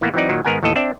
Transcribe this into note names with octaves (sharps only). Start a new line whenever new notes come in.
A2 E3 A#3 B3
E3 F#3 C4 D#4 D5
A#2 D#3 F#3
G#2 D#3 B3 A#4 F#5 G#5
D#2 A2 E3 A4 D#5
C4 D4 D5 E5